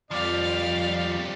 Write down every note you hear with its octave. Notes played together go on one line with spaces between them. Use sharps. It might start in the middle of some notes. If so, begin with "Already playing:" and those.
F2 F3 G3 D5 F5